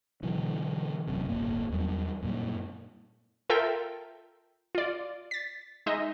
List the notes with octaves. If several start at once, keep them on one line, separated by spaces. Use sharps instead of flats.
B2 D3 E3 F#3
F1 F#2 C3
D1 G1 A#3
E2 F#3 G3
F#2 A#2 G3
F4 A4 A#4 E5 G5
F4 D5
A6 B6
G#3 D#4 D#5 E5